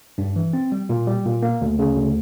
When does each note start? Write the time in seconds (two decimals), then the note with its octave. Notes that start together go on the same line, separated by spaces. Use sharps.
0.18 G2
0.36 E3
0.53 C4
0.72 G3
0.89 A#2
1.07 G3
1.25 A#2
1.43 A#3
1.61 D2
1.79 C#3
1.97 D2